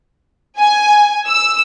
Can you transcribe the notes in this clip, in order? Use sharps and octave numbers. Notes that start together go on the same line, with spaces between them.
G#5
E6